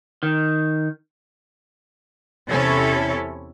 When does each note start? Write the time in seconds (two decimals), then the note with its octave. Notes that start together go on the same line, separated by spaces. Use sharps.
0.23 D#3
2.48 E2 C3 C#4 E4 A4 C#5